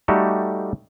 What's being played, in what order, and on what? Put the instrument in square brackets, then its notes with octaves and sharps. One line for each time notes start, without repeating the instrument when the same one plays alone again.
[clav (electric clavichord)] G3 A3 D#4 F#4 G4 A4